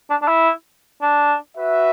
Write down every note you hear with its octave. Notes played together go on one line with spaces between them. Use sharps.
D4
D4
E4
D4
F#4 B4 E5